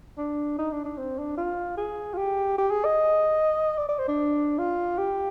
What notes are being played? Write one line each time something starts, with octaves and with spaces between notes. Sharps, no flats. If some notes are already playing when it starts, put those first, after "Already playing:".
D4
D#4
D4
D4
C4
D4
F4
G#4
F4
G4
G4
G#4
D#5
D5
D5
C5
D4
F4
G4